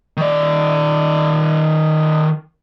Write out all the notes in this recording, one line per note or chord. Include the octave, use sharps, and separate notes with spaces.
D#3 D5